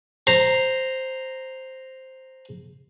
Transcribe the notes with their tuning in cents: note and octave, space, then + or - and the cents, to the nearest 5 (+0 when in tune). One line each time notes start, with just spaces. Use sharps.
C5 +0 A#5 -5